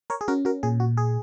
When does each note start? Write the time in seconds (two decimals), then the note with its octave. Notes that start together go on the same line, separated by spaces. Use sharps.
0.10 A#4 C#5
0.21 G#4
0.28 C#4 F#4 A#4
0.45 F#4 A#4
0.63 A#2 G#4
0.80 F#4
0.97 G#4